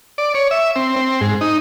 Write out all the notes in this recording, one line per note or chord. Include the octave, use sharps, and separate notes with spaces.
D5
C#5
E5
C4
C4
G#2
D#4